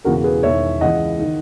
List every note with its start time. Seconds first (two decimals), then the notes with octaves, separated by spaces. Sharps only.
0.05 E1 E2 C#3 E3 F#4 A#4
0.24 G#4 B4
0.43 E1 E2 D#3 C#5 E5
0.81 C#2 C#3 E3 D#5 F#5
1.19 D#3